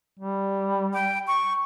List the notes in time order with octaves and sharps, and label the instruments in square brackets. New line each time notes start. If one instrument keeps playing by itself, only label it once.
[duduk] G3
[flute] G5
C#6